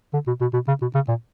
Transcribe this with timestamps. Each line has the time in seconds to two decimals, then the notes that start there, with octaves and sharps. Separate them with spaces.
0.13 D3
0.27 B2
0.41 B2
0.54 B2
0.68 C#3
0.82 B2
0.95 C#3
1.08 A#2